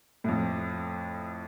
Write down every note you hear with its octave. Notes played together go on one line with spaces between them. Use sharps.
F2 A2